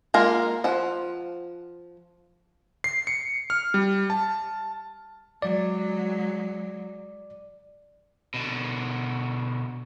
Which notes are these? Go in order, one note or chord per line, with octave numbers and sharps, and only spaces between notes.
G#3 A#3 F4 A#4
F3 F#5
C7
C#7
F6
G3
A5
F#3 G#3 D5
B2 D3